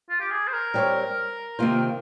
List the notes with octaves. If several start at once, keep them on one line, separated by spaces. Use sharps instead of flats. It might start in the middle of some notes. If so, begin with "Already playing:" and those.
F4
G4
G#4
C5
A#4
G3 C4 G4 C#5
C3 D#3 A#3 F4 C5